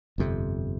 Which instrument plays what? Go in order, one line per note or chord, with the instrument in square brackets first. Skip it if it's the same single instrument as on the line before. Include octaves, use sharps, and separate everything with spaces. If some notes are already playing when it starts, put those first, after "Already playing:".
[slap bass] G1 F2 C3